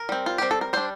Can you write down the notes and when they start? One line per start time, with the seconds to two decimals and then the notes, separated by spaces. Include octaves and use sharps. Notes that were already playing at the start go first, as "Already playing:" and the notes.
Already playing: A#4
0.09 G3 C4
0.26 F4
0.38 G3 C4 G4
0.51 A4
0.61 A#4
0.73 G3 D4 C5